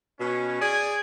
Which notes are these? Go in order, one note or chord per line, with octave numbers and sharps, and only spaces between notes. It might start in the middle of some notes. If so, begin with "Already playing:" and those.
B2 C#4
G#4 D5 G#5